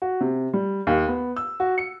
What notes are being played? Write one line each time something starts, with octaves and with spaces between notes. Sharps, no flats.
F#4
C3
G3
D#2
B3
E6
F#4
C#7